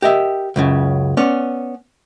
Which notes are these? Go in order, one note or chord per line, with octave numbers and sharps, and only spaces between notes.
G4 A#4 D#5 E5
C#2 F#2 C#3
B3 C#4 D5